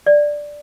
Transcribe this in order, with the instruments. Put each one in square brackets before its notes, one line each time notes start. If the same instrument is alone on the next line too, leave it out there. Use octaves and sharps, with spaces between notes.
[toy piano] D5